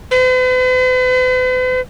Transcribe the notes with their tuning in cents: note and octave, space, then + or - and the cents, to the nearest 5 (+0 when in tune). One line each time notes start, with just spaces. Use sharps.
B4 +45